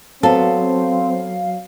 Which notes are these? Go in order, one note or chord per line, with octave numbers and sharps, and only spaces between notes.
F#3 B3 C4 A4 F5